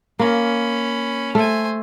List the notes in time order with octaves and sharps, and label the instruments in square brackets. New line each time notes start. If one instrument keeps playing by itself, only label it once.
[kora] A#3 [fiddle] C#4 B5
[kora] A3 [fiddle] C5 G#5